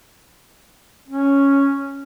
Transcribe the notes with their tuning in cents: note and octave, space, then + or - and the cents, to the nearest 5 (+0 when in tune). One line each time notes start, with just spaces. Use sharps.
C#4 +0